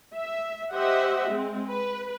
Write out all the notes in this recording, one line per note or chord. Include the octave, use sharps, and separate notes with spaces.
E5
G4 C5 D#5 E5 F#5
G#3 C4
B4